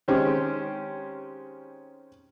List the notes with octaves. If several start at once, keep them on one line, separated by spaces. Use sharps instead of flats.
D#3 G#3 C4 C#4 G4